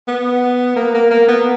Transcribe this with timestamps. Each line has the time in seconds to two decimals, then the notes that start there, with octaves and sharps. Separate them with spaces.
0.08 B3
0.76 A#3
0.94 A#3
1.11 A#3
1.28 B3